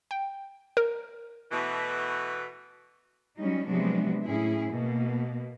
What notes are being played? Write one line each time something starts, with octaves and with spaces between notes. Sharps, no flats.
G5
A#4
B2 E3 A3
F#3 G3 C#4 D#4
C3 F3 F#3 G#3 B3 D4
A2 C#4 E4 G#4
B2 A#3